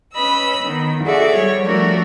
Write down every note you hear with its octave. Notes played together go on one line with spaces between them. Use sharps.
C#4 B4 D#5 B5 E6
D#3 B3
F#4 G#4 A4 D5 E5
G3 C#5
F3 G3 A3 D4 F#4 A#4